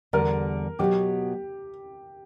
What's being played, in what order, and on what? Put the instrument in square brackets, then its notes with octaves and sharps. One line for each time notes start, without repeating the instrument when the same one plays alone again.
[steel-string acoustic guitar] E2 D3 G3 [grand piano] A#4
[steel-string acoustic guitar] B2 F#3 B3 [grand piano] G4